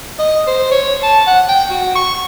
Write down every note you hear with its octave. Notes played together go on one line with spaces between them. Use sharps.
D#5
C5
C#5
A5
F#5
G5
F#4
C#6